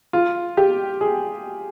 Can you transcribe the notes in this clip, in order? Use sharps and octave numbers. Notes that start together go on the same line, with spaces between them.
F4
G4
G#4